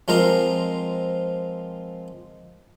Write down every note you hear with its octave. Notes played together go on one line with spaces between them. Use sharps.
F3 G#3 C4 A#4 C5 F5